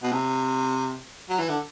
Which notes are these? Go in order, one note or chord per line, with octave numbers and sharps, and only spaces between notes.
B2
C3
F#3
E3
D3